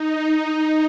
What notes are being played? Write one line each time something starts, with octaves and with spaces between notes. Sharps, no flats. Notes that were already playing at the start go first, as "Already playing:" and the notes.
Already playing: D#4